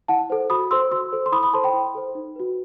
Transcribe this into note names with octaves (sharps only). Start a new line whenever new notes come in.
E4 F#5 A5
A4 C5
F#4 B5 D#6
A4 C5 C6 E6
F#4 C6 E6
A4 C5
C6
E4 B5 D#6
B5 D#6
A4 C5 A5 C6
G5 B5
E4
A4 C5
D#4
F#4 B4